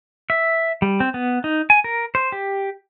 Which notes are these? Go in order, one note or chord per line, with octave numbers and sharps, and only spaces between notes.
E5
G3
C4
B3
D#4
G#5
A#4
C5
G4